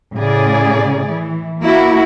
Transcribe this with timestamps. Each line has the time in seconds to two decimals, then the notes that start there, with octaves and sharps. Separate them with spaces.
0.15 A2 C#3 G#4 D5
1.07 E3
1.62 A#3 E4 F#4